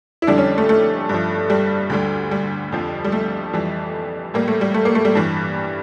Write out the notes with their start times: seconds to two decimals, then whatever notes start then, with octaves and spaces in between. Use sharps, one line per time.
0.22 E4
0.27 F2 D3 G3 D4
0.38 C#4
0.58 A3
0.69 A3
1.09 G2 F3
1.50 G3
1.90 D2 D3 G3
2.31 G3
2.72 F2 D3 F3
3.04 G3
3.12 A3
3.53 F2 E3 G3
4.34 A2 G3 A#3
4.48 A3
4.61 G3
4.74 A3
4.85 A#3
4.95 A3
5.05 G3
5.15 G2 E3 G3